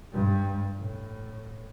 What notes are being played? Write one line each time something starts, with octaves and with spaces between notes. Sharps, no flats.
G2 G3
A2